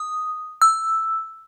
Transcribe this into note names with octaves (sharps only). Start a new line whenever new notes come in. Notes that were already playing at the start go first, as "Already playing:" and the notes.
Already playing: D#6
E6